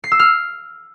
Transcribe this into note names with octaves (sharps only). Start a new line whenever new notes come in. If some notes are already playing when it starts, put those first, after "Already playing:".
C7
E6
F6